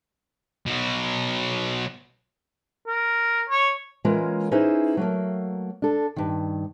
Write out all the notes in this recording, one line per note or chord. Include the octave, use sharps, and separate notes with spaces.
B2 F#3
A#4
C#5
E3 G#3 A#3 C#4 F4 A#4
C#4 D#4 E4 G#4 B4 C5
F#3 A3 A#3
D4 A4
G2 D#3